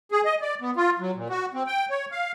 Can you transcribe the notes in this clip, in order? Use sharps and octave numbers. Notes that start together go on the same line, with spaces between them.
G#4
D#5
D5
B3
F4
F#3
A#2
F#4
C4
G5
C#5
F5